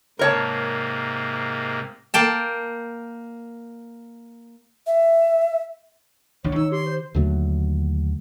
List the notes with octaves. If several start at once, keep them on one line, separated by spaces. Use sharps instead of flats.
G#2 C3 A#3 A#4 C#5 A5
A#3 G5 A5
E5
A1 D#3 D4 C#5
D#3 D#4 E6
G4 C6
C5
D#2 D3 F#3 A3